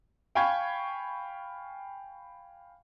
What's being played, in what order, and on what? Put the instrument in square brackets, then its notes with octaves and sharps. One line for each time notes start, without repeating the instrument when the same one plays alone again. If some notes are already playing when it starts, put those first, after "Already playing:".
[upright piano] F5 G5 G#5 B5 C#6 G#6